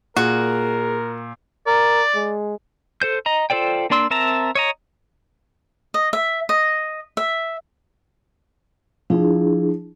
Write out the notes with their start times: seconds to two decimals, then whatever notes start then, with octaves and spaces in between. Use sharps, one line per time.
0.17 A#2 F#4 G#4 A#4
1.67 A#4 D5
2.15 G#3
3.02 A4 C5 G6
3.26 D#5 A#5
3.50 F4 A4 C5 D5 G5
3.90 A#3 D4 D5 C6 E6
4.10 C4 A#4 E5 A5 A#5
4.55 C#5 D#5 A#5
5.94 D#5
6.13 E5
6.49 D#5
7.17 E5
9.10 F3 D4 E4 G#4